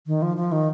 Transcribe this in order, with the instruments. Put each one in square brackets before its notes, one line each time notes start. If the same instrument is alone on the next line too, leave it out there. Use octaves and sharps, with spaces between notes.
[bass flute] D#3
F3
F3
D#3